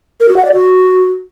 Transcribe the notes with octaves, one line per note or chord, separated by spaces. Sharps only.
A#4
F#4
F#5
D5
F#4